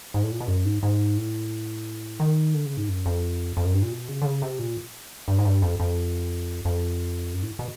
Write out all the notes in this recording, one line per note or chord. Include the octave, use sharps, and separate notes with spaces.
G#2
A2
A#2
B2
F#2
G#2
G#2
A2
D#3
D3
C#3
G#2
F#2
F2
F2
F#2
G2
A#2
B2
C#3
D3
C#3
C3
A#2
G2
G#2
G2
F2
F2
F2
F#2
A2
B2